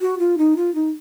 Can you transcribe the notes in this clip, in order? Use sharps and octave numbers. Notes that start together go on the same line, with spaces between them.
F#4
F4
D#4
F4
D#4